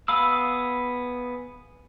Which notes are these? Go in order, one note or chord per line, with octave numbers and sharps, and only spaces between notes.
B3 G#4 F5 B5 E6